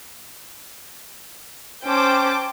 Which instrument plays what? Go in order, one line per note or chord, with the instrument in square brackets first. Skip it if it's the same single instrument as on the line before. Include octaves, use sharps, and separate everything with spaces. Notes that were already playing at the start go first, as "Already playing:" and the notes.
[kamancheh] C#4 C5 [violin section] G5 A5 D6